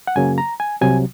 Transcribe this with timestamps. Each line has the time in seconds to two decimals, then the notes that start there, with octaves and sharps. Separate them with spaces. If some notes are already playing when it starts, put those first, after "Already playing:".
0.07 F#5
0.16 F#2 C#3 F#3 A#3 G#5
0.38 A#5
0.60 G#5
0.81 C2 C3 F#3 G#5